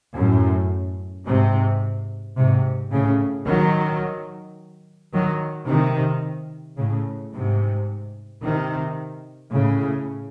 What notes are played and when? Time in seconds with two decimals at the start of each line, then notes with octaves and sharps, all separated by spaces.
0.15 F#2 A2
1.26 G#2 C3
2.37 G#2 C3
2.92 A2 C#3
3.47 D#3 F#3
5.13 D#3 F#3
5.68 C3 D#3
6.78 A2 C#3
7.33 G#2 C3
8.43 C3 D#3
9.54 A2 C#3